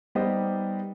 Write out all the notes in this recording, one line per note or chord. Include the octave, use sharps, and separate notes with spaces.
G3 B3 D#4 G4 C5 D#5